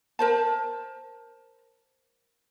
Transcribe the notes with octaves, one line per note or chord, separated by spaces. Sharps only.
A#4 C5 A5